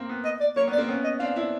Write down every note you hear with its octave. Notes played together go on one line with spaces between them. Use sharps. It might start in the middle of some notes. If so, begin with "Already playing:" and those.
Already playing: A#3 C4
B3
D#5
D5
A#3 C#5
B3
D5
A#3 C4
B3 C#4
D#5
C4 D4 F5
D4 E4